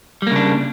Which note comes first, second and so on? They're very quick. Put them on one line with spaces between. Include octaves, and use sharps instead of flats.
G3 A#3 C#3 D4